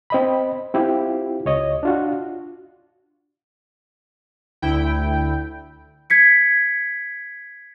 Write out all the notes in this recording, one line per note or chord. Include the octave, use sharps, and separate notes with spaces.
C4 D#5 B5
C4 E4 F4 G4
C#2 C#5 D#5
D4 F4 F#4
D2 E4 G5
G#6 B6 C#7